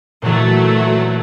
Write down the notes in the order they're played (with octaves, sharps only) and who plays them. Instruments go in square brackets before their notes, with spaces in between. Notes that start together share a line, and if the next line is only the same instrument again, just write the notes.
[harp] A#2 E3 [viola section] F#3 A3